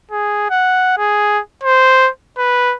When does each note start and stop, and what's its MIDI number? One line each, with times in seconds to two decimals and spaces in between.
0.11 0.50 68
0.50 0.97 78
0.98 1.40 68
1.63 2.09 72
2.38 2.76 71